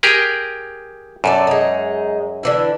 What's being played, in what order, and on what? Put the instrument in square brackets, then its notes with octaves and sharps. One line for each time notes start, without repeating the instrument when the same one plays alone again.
[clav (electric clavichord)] G4 G#4 A#4
[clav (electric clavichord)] F#2 [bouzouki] A4 C#5 D5
[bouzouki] G#3 D#4
D3 E3 E4